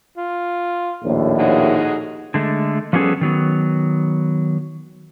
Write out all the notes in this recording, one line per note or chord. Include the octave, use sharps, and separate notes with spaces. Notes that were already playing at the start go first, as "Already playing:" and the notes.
F4
A#1 D#2 A2
D#4 F#4 G#4
D3 G#3 A3
F3 G3 B3 C#4 G#4 A4
D#3 F#3 B3